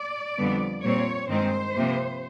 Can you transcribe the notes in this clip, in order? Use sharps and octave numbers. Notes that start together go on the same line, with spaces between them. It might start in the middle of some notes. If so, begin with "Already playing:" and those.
Already playing: D5
F2 D3 G3 B3
A#2 G3 C4 C#5
G2 D#3 G#3 C4 C5
C3 F3 A#3